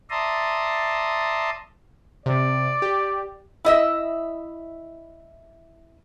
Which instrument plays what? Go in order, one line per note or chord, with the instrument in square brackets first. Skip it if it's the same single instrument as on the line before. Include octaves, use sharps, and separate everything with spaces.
[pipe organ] D5 E5 A5 A#5 C6 D#6
[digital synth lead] C3 [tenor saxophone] D5
[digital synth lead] G4
[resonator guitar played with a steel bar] E4 D#5 E5